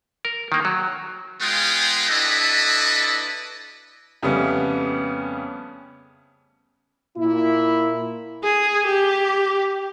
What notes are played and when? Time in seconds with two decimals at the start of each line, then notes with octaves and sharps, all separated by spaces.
0.25 A#4
0.52 D#3 A#3
0.65 F#3
1.41 G#3 B3 F4 G#4 G5
2.09 D4 E4 F#4 A4 B4 D#5
4.23 F2 C#3 G3 A3 B3 C#4
7.17 A#2 A#3 E4
8.43 G#4
8.87 G4